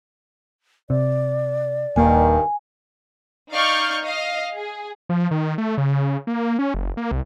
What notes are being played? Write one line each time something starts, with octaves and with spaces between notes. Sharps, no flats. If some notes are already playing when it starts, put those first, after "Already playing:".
C3 D5
D#1 G2 D#3 A#3 G#5
D#4 D5 F5 C#6 F6 G6
D#5 F5
G#4
F3
D#3
A3
C#3
A#3
C#4
F#1
A#3
C2